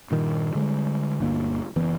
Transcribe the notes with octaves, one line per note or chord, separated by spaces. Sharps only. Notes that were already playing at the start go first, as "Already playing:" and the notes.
G2 A#2 D#3
D3 G3 G#3
G1 D2 A#3
F#1 E3 B3